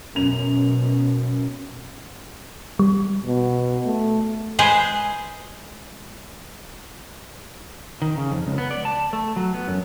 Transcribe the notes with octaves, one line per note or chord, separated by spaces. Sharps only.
F#2 B2 F7
G3
B2
A3
G#3 G#4 B4 C5
D#3
C#3
F2
C#2
B3
D5
A5
A3
F#3
B3
F#2